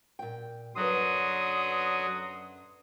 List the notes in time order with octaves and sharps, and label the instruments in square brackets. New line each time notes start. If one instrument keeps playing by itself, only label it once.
[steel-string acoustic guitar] A#2 G5
[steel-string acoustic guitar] F#2 B4 [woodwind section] D3 C6 D#6 [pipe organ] F#3